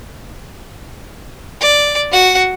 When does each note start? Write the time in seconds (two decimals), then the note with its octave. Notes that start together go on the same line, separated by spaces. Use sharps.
1.61 D5
2.11 F#4 F#5